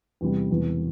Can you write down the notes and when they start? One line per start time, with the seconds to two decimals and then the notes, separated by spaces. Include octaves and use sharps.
0.21 E2 C3 G3
0.49 E1 E2 C3